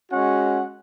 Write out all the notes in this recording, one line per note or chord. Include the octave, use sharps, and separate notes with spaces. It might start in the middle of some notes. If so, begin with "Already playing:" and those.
G#3 C#4 F#4 F#5